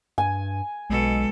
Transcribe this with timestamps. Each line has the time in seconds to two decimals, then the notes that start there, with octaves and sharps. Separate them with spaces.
0.18 G2 G#5
0.90 B1 B2 G#3 A4